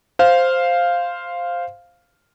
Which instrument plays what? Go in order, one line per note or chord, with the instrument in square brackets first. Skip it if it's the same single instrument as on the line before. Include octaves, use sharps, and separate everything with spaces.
[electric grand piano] C5 F5